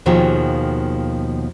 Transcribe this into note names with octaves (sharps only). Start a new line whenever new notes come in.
D#2 B2 D#3 F3 G4 G#4